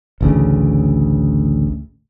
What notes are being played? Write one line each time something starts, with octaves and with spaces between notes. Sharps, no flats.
A1 D2 C#3